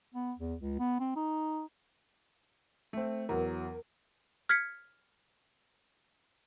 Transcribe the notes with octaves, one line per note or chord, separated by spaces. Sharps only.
B3
E2
C#2
B3
C4
D#4
A3 C4
E2 F#3 A#4
F6 G#6 B6 C#7